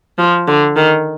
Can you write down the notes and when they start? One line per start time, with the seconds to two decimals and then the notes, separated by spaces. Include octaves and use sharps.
0.18 F3
0.48 D3
0.76 D#3